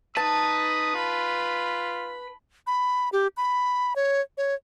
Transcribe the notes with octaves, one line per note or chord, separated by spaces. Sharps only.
D#4 B4 A5 D#6
F4 B5
B5
G4
B5
C#5
C#5